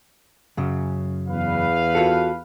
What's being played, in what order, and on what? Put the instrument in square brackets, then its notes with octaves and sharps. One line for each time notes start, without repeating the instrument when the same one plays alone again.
[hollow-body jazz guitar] F#2 C#3
[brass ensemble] E2 B4 F5
[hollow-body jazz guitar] F4 F#4 A4